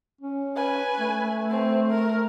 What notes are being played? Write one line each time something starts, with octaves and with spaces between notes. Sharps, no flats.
C#4
B4 G#5
A3
C4
A#4